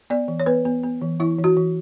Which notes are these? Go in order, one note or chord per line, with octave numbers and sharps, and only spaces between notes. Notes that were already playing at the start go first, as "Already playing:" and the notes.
B3 D5
E3
C#5
B3 B4
B3
B3
E3
E3 E4
E3
F#4
E3